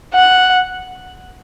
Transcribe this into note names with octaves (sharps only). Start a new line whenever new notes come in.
F#5